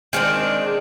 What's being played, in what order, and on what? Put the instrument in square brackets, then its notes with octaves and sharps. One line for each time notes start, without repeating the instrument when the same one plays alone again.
[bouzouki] D#3 G#3 C4 D4